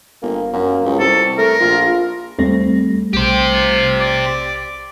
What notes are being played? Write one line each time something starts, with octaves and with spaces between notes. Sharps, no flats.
G1 A#3
F#2 A#3
C#2 G2
C2 C3 A4
A3 A#4
A#1 F4
D#2 G3 A3 C4 A#6
B1 G4 C5
F4
D5